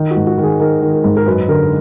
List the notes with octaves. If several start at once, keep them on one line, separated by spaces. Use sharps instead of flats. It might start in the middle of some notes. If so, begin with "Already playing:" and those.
Already playing: D#3 D#4
F#4
G#2
F#4
D#3
G#4
D#3 A#4
D#3
A#4
G#2
A#4
F#2 B4
D3 A#4